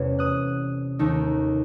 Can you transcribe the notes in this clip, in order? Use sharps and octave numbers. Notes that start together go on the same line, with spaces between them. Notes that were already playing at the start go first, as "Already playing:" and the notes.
Already playing: E2 C3 E3 A3 C#4
D#6 F#6
D#2 D#3 A3 D#4